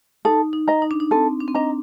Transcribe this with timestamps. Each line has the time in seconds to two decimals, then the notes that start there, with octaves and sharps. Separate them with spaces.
0.25 D#4 A4
0.53 D#4
0.68 D#5 A#5
0.82 D#4
0.91 D4
1.00 D#4
1.11 C4 A4
1.40 D4
1.48 C4
1.54 D4 D#5 A#5